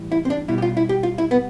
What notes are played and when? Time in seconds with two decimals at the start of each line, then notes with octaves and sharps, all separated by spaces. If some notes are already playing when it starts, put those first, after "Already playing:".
Already playing: A2 E3 G3
0.12 E4
0.25 C4
0.30 D4
0.48 B2 G3 E4
0.58 G4
0.62 F4
0.77 E4
0.89 G4
1.03 F4
1.18 E4
1.31 B3